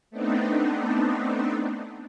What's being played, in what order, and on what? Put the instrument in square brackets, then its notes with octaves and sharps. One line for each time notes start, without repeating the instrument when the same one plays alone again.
[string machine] A3 B3 C4 D4 D#4